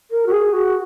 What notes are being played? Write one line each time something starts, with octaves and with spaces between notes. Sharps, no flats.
A#4
F#4
G#4
F#4